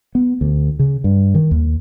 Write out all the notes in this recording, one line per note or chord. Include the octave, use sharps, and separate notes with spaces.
B3
D2
C#3
G2
D#3
D#2